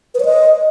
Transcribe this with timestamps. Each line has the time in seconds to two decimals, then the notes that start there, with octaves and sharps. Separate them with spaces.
0.14 B4
0.20 C#5
0.25 D#5